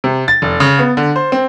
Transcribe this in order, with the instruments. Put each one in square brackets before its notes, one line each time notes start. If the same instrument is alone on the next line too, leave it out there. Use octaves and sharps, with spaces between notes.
[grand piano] C3
A6
F1
C#3
B3
D3
C5
C4